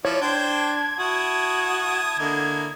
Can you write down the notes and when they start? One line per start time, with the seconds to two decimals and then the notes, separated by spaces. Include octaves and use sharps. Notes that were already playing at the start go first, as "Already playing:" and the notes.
0.05 F3 E4 C#5 D5
0.22 D4 C5 G5 G#6
0.99 E4 F#4 A5 D#6
2.19 D3 A#3 E4 D#5